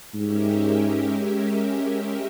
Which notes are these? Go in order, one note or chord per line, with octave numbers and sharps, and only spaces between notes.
G#2 G#3 C#4 G4 A#4 E5